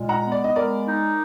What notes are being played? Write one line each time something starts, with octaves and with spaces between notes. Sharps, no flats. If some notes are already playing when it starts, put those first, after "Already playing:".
Already playing: A#2 G#3
F#5 A#5
B3
D5
D#5
G#3 A#4 D5
D#4